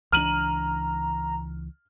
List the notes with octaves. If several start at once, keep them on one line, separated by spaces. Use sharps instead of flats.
C#2 E3 D4 A#5 F6 D#7 F#7